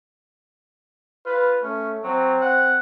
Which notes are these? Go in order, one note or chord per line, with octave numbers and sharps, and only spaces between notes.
F4 B4
A3 C#4
F#3 C4
F#5